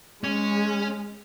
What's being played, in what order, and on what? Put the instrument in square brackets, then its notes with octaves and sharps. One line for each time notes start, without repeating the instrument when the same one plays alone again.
[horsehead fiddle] G#3 [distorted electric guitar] C#4